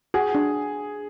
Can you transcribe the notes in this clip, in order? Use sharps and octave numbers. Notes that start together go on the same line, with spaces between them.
F#4 G#4
D4